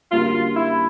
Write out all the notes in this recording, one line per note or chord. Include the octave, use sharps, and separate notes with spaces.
F#2 D3 G3 A#3 C#4 F4
E4